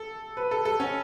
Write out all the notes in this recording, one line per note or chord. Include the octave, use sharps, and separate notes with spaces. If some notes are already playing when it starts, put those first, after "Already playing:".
Already playing: A4
B4
A4
A4
C#4